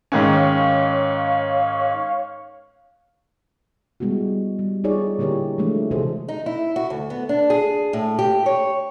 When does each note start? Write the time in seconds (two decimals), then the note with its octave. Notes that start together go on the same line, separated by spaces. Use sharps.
0.12 G#2 D#3 C#4 C#5 F5
4.00 G3 G#3 B3 E4 F#4
4.59 G3
4.84 D#4 F4 G#4 C#5 D5
5.19 D3 A#3 E4 G4 A#4 C#5
5.58 E3 F3 G#3 A3 D4
5.91 C3 E3 F#4 G#4 A4 C5
6.28 D#4
6.46 E4
6.76 F#4
6.90 D2
7.10 B3
7.29 D4
7.50 G#4
7.93 A2
8.19 G4
8.46 C#5